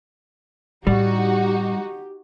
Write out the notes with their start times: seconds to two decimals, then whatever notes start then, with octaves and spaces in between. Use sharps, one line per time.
0.87 A2 G3 D4 D#4 F#4 G4